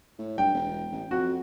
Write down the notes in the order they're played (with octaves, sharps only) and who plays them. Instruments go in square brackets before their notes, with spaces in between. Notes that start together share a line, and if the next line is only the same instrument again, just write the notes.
[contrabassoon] A2
[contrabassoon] G2 [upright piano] G5
[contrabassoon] E1
A1
[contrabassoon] F2 [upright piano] F#4